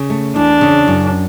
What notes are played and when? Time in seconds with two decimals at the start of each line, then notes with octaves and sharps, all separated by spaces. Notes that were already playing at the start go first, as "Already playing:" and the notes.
Already playing: C#3
0.10 A3
0.36 E2 D4
0.61 C#3
0.88 F#2